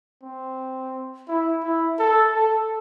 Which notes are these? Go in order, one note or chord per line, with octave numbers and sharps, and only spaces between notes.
C4
E4
E4
A4
A4